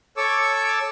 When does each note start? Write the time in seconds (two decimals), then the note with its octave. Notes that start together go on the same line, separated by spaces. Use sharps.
0.17 A4 C#5 C#6 D6 E6